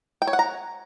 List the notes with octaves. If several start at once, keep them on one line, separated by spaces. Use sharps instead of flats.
G5
C#5
F#5
A#5